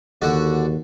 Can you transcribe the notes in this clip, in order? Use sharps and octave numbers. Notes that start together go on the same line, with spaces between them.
D#2 D3 F#4 D5